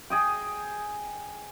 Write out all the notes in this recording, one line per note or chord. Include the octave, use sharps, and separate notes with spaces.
G#4 D#5 G5